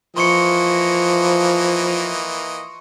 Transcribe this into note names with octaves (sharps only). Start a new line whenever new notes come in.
E3 F3 A#3 D#5 C6 C#6 C#7